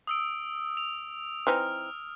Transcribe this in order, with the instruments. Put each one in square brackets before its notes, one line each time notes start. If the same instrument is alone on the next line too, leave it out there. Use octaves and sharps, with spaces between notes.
[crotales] D#6 E6 D7
F7
[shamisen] E3 C4 D#4 [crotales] F6